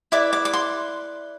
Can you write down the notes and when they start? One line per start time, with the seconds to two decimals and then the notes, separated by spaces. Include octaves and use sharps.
0.12 E4 B4 D5 D6
0.33 D6
0.45 D6
0.53 C6